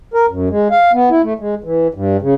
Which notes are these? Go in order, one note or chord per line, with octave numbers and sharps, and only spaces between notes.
A#4
F#2
G#3
F5
B3
E4
A3
G#3
E3
G2
C#3